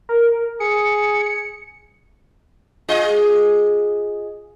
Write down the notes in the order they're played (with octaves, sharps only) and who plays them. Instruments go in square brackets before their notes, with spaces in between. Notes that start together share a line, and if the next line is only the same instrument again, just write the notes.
[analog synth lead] A#4
[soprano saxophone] G#4 [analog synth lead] C#7
[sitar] F4 G#4 D#5